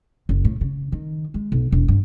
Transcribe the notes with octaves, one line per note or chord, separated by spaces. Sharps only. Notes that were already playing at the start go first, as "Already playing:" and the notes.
F#1
A2
C#3
D#3
G#3
B1
E1
G2